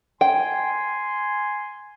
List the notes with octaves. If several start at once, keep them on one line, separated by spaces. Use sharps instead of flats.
G5 G#5 C6